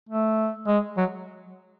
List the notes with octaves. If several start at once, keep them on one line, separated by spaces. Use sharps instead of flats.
A3
G#3
F#3